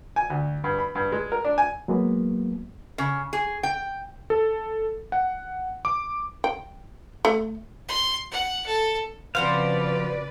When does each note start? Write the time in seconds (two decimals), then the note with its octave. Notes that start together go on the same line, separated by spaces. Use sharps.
0.16 G#5
0.30 D2
0.64 G2
0.78 B5
0.95 G2
1.12 G#3
1.32 A#4
1.45 D4
1.58 G#5
1.88 F#3 G#3 A#3 B3
2.98 C#3
3.33 G#4
3.63 G5
4.30 A4
5.12 F#5
5.85 D6
6.44 G5
7.25 A3
7.89 C6
8.31 F#5
8.66 A4
9.35 C#3 F3 C4 F#4 B4 C5 D5 F5